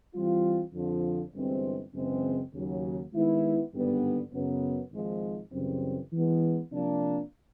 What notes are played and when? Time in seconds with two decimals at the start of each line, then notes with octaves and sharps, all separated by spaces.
0.14 E3 G3 C4 F4
0.74 F2 D3 F3
1.34 G1 G2 E3 G#3 C4
1.94 F#2 C#3 E3 G#3 C4
2.54 D#2 C#3 F#3
3.13 D#3 G#3 B3 E4
3.73 G#1 G2 D3 G3 B3
4.33 F#2 C#3 F#3 B3
4.92 G#1 G#2 F3 G#3
5.52 F#2 C#3 E3 G3 C4
6.12 E3 G#3 B3
6.72 C3 F3 A#3 D4